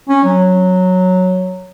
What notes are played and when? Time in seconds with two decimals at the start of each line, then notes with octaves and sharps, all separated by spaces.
0.09 C#4
0.24 F#3